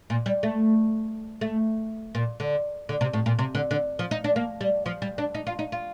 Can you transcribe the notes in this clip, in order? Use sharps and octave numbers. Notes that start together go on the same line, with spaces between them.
A#2
G3
A3
A3
A#2
D3
D3
C3
A2
A#2
C3
D3
D3
F3
D#4
D4
A#3
G3
F3
G3
D4
D#4
F4
D#4
F4